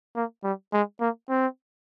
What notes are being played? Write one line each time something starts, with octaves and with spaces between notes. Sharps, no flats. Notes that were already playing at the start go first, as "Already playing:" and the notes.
A#3
G3
G#3
A#3
C4